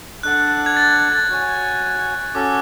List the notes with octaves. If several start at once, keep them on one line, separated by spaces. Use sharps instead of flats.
D4 A4 D5 F#5 F#6
G#6
A6
A6
F#4 C#5 G#5
C#4 F#4 A4 D6